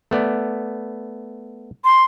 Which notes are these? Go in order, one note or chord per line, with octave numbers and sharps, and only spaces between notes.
A3 B3 D5
C6